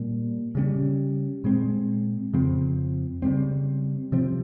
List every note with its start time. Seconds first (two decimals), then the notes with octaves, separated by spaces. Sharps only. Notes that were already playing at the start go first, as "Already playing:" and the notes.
Already playing: A#2 G3 A#3
0.55 C#3 G3 C#4
1.44 A#2 G#3 C4
2.33 F2 C#3 F3 C4
3.22 C#3 G3 C4
4.12 C3 F3 C4